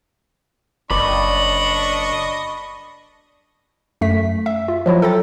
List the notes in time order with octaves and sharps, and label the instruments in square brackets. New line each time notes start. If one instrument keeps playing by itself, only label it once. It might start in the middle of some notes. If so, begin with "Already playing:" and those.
[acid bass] F#1 [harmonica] D4 D#5 C#6 [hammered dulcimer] D5 [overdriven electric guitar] B5
[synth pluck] F#2 A3 B6
E5
F4
F3 F#3 E4 F#4
A4 G5 A#5 A6